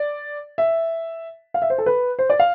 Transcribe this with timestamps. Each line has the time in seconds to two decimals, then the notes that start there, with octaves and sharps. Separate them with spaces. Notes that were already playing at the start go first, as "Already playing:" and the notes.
Already playing: D5
0.58 E5
1.54 F5
1.62 E5
1.70 C5
1.78 A4
1.86 B4
2.19 C5
2.30 D5
2.39 F5